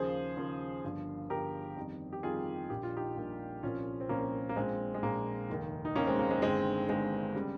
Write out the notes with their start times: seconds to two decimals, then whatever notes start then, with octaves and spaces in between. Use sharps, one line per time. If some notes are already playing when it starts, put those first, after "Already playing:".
Already playing: D#2 C#3 F3 G#4 C5
0.37 D#2 C#3 F3
0.84 G1 G2 F3
1.30 G1 G2 F3 G4 A#4
1.77 F2 D#3 G3
2.13 G4
2.23 F2 D#3 G3 F4 G#4
2.70 A#1 A#2 G3 G4
2.83 F4
2.96 D#4 G4
3.16 A#1 A#2 G3
3.63 C2 A#2 F3 C#4 F4
4.01 C4
4.09 C2 A#2 F3 A#3 C#4
4.49 A#3
4.56 A#1 A#2 F3 G#3 C4
4.94 G#3
5.02 A#1 A#2 F3 A#3
5.49 F1 D#2 D#3
5.85 D#4
5.96 F1 D#2 D#3 A#3 C#4
6.07 G#3 C4
6.19 A#3
6.31 G#3 C4
6.42 G1 G2 D#3 G#3 C4
6.89 G1 G2 D#3 G#3 C4
7.35 C#3 G3